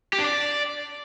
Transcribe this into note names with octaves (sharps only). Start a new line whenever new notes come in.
G4
D4
D5